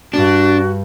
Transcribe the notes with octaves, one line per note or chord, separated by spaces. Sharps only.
G2 D4 F#4 A5